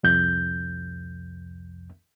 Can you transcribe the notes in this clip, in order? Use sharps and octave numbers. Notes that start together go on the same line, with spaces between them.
C2 F2 G6